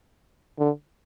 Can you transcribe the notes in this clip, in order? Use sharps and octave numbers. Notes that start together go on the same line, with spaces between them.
D3